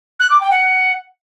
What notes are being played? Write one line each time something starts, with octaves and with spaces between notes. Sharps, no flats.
F#6
D6
G5
F#5